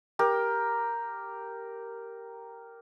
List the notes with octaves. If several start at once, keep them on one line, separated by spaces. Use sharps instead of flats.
G4 A#4